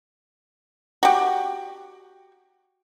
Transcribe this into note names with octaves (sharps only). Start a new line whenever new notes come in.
F#4 G4